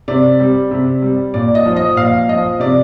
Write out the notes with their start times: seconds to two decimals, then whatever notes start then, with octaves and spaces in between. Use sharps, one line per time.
0.08 C3 D5
0.40 G3
0.71 C3
1.02 G3
1.34 A#2 D5
1.55 D#5
1.66 F3
1.76 D#5
1.97 A#2 F5
2.29 F3 D#5
2.60 C3 D5